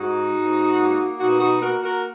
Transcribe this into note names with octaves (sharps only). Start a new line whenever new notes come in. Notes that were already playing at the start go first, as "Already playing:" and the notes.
Already playing: G#2 D#4 F#4
G#2
A#3
B2 D#4 F#4
D#4 F#4
A#3 F#4 A#4
F#4 A#4